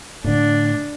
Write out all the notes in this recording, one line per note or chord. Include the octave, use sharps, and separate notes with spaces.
A2 D3 D4